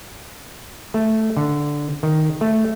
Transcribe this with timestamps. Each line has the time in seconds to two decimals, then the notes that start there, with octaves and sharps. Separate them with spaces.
0.94 A3
1.37 D3
2.03 D#3
2.41 A3